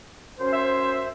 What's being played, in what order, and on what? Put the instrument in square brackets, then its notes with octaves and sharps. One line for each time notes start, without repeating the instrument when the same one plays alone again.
[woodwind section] F#2 C#4 C5
[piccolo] E5